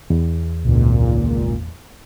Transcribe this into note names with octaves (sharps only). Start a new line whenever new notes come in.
E2
G#1 C#2 A#2